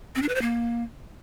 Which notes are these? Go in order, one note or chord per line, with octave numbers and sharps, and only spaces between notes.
C4
D4
B4
C5
A#3